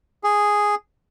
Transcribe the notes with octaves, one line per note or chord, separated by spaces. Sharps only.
G#4